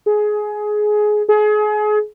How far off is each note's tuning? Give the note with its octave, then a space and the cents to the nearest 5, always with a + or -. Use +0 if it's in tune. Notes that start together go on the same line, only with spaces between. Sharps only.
G#4 +15
G#4 +30